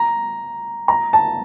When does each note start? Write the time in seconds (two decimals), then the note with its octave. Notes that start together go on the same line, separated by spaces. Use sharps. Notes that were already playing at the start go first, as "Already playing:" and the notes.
Already playing: A#5
0.88 A#5
1.13 A5